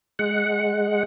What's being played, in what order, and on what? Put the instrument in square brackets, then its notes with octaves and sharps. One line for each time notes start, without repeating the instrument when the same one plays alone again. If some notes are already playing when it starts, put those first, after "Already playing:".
[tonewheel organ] G#3 F#5